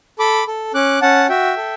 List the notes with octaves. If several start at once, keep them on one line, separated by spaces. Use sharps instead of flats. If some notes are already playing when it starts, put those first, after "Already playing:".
A4 B5 D6
A4
C#4 D6 F#6
C#4 F#5 A5
F#4 E5 G5
A4